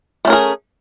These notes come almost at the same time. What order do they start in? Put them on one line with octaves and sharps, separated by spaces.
A3 C#4 A#4 G#4